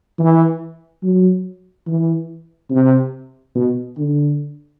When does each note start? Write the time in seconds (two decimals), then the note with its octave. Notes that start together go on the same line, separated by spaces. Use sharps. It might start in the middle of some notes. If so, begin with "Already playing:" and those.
0.19 E3
1.03 F#3
1.87 E3
2.70 C3
3.55 B2
3.97 D3